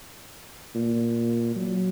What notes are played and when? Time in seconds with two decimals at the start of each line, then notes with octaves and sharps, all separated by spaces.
0.75 A#2
1.56 F#3